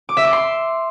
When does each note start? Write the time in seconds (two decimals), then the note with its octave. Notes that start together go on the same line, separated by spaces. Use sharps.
0.09 D6
0.17 E5
0.25 D6
0.33 C6